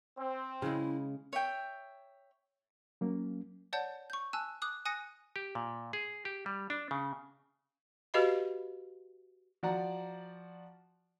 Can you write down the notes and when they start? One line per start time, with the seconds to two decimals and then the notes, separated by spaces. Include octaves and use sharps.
0.19 C4
0.62 C#3 G#3 E4
1.33 C#5 E5 G5
3.01 F#3 A#3 C#4
3.73 C#5 D5 F#5 A5 G6
4.10 C#6 G6
4.33 G#5 A5 E6 F#6
4.62 D6 D#6 F#6
4.85 G#5 D#6 F#6 A#6 C#7 D#7
5.36 G4
5.55 A#2
5.93 G#4
6.25 G4
6.46 G3
6.70 D4
6.91 C#3
8.14 F#4 G4 B4 D#5 F5 B5
9.63 F3 F#4 D5 F#5 A#5